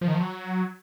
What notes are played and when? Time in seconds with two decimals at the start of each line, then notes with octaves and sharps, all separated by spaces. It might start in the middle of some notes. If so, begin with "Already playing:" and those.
0.01 F3
0.08 D#3
0.14 F3
0.20 F#3